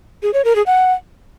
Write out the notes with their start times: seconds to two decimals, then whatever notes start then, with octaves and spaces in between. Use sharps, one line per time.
0.23 G#4
0.34 C#5
0.45 A#4
0.56 G#4
0.67 F#5